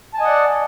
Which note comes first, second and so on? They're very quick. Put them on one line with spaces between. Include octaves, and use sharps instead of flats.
A5 G#5 D#5 F#5 D5